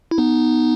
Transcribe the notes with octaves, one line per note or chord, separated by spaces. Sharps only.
E4
B3 D#4